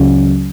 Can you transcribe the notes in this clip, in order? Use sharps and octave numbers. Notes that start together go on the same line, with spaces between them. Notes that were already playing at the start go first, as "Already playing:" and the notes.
Already playing: C#2 C#3 F#3 C#4